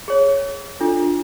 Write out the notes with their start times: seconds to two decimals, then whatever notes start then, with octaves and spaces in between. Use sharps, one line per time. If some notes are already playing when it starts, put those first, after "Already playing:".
0.08 G#4 C#5
0.81 D4 F4 A4